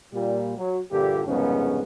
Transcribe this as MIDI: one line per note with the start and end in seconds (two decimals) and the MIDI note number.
0.13 0.52 46
0.13 0.52 55
0.56 0.78 54
0.91 1.21 34
0.91 1.21 43
0.91 1.21 46
0.91 1.21 50
0.91 1.21 67
1.26 1.81 36
1.26 1.81 41
1.26 1.81 44
1.26 1.81 49
1.26 1.81 59
1.26 1.81 61